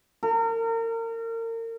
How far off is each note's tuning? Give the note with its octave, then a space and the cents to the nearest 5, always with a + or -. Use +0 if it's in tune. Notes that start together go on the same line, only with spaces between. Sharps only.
A#4 -35